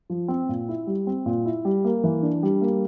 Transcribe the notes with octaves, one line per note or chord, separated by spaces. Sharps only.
F3
C4
A#2
E4
G3
C4
A#2
E4
G3
A#3
E3
D4
G3
A#3